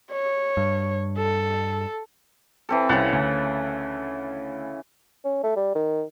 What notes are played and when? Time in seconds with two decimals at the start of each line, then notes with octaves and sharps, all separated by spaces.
0.12 C#5
0.57 G2
1.18 A4
2.69 E3 C4 A4
2.89 C2 C#3 F#5 A6
3.12 D2
5.25 C#4
5.43 A3
5.56 G3
5.75 D#3